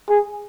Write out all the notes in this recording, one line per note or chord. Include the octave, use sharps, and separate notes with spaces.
G#4